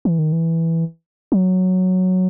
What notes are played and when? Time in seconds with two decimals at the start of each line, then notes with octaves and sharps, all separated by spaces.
0.05 E3
0.19 D#3
0.32 E3
1.32 F#3